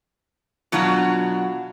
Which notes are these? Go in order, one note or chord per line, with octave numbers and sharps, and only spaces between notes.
B2 F#3 D4 F4 F#4